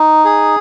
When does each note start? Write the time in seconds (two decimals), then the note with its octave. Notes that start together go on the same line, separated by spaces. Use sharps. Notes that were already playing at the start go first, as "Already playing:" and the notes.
Already playing: D#4
0.25 G#4